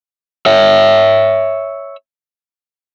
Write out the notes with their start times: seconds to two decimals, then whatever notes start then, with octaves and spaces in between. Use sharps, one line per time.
0.46 C#5 E5